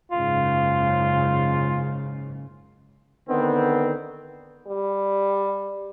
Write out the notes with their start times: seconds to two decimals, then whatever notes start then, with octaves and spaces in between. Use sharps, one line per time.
0.12 F#1 G#2 C#3 F4
3.29 D3 D#3 B3 C4
4.67 G3